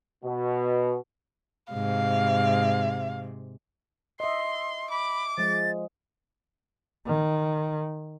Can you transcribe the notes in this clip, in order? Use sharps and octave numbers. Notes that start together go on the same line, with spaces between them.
B2
G#2 C3 F5
D#5 E5 C6
B5 D6
F3 G#3 A6
D#3